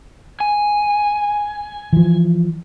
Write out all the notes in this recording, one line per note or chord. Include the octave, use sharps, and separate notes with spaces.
G#5
E3 F3